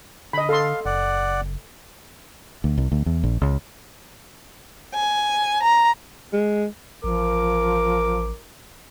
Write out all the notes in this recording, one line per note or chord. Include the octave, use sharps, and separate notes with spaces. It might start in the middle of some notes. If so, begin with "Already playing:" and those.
D3 D#5 B5
A4 F5 C6
F#1 D5 F#5
D2
C2
D2
E2
A#1
C#2
G#5
A#5
G#3
A1 F3 A#4 D6